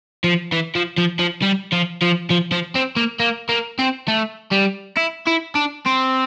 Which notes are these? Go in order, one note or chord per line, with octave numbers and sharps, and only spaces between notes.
F3
E3
F3
F3
F3
G3
F3
F3
F3
F3
C4
A#3
A#3
A#3
C4
A3
G3
E4
E4
D4
C4